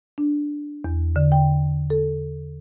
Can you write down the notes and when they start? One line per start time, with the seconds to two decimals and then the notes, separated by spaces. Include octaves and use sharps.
0.18 D4
0.84 E2
1.16 D3
1.32 G5
1.90 A4